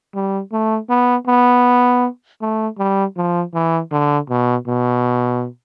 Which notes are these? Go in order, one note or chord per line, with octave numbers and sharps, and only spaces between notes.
G3
A3
B3
B3
A3
G3
F3
E3
D3
B2
B2